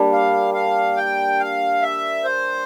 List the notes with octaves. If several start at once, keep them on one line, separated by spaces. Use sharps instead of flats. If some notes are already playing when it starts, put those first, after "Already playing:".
Already playing: G3 A#3 D4
F5
F5
G5
F5
E5
C5